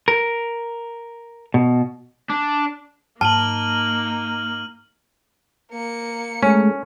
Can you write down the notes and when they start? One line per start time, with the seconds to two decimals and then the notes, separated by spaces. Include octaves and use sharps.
0.08 A#4
1.54 B2
2.30 D4
3.21 G#2 F#3 A#3 D#4 A5 F6 D#7 F#7
5.72 A#3 C#7
6.43 G#3 A3 C#4